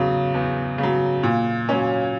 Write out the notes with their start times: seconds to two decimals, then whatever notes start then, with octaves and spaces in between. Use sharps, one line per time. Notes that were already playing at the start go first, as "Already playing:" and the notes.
Already playing: E2 C#3 F#3
0.34 E2
0.78 C#3
0.83 F#3
1.23 A#2
1.69 F#3 C#4